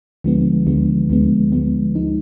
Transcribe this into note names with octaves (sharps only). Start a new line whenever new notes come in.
D2 D3 F3 G#3 B3
D2 D3 F3 G#3 B3
D2 D3 F3 G#3 B3
D2 D3 F3 G#3 B3
F3 G#3 D#4